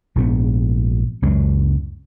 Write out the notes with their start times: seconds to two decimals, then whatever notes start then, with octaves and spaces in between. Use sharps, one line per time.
0.16 A#1 G#2 D3 B3
1.22 C#2 F#2 F#3 G#3